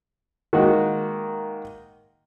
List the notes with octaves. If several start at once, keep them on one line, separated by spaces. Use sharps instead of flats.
D#3 G#3 A#3 F#4